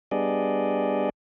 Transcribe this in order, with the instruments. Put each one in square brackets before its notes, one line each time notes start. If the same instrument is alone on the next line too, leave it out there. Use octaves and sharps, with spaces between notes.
[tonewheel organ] G3 B3 D4 G#4 D5 D#5